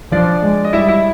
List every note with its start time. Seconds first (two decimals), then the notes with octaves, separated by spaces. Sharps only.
0.12 F3 D4 D5
0.42 G#3
0.64 D#5
0.73 G3 E4 E5
0.88 E4 E5